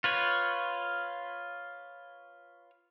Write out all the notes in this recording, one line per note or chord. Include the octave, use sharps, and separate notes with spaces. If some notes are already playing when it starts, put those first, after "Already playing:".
F4 B4 C#5